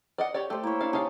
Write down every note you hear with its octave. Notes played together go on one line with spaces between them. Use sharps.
D5 D#5 F#5
G4 C#5 D5
A3 G4 C5
A#3 E4 C#5
D4 F5
C#3 D#4 G4 G#4 F5 A5